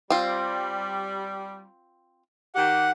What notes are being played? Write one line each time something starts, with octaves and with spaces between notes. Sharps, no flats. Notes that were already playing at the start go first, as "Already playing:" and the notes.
G3 C4 F4
D#3 G4 F#5